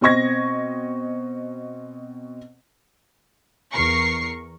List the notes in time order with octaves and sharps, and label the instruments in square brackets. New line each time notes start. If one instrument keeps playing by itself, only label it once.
[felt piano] B2 C4 D#5 C#6 G#6 A#6
[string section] E2 A#4 C#6 C7